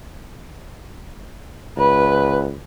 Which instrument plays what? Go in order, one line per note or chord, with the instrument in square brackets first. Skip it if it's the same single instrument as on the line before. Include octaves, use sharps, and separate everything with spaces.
[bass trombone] C#2 [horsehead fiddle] B4